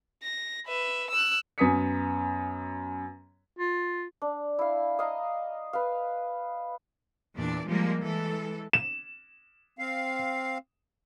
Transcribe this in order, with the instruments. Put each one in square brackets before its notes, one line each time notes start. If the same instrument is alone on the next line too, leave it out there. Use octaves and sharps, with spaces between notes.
[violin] A#6
B4 E5
E6 F#6
[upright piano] F#2 B3 G#5 D#6 B6 C#7
[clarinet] F4
[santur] D4
E4 F5
D#5 F5 A#5
B4 F5
[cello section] E2 A#2 D4 D5
F3 G3 G#3 A#3
E3 G#3 A4
[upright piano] E7
[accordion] C4 F5